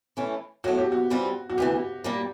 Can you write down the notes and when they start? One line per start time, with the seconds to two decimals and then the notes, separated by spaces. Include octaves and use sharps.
0.17 E3 A3 C#4
0.64 A2 F#3 A3 F#4
0.78 G4
0.92 F#4
1.10 E3 G3 C4 F4
1.50 F#4
1.57 D2 C3 E3 G4
2.04 A#2 G3 A#3